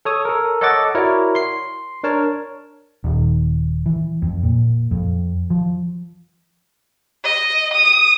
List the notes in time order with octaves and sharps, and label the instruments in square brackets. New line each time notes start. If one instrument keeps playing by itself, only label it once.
[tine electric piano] A4 C#5 D#6
A4 A#4
A4 C#5 D#5 F#5 D6 A6
E4 F#4 A#4 C#5 D5
C6 C7
D4 A#4 C#5 A5
[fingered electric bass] D#1
E3
F2
A#2
F2
F3
[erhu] D#5
D#6